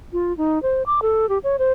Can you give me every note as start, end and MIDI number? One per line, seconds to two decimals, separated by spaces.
0.13 0.35 65
0.37 0.61 63
0.63 0.83 72
0.86 1.00 86
1.02 1.28 69
1.29 1.38 67
1.44 1.56 73
1.59 1.72 72